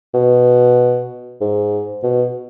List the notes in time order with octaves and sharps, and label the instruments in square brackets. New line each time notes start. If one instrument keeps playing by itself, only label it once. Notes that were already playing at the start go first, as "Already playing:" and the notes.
[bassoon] B2
G#2
B2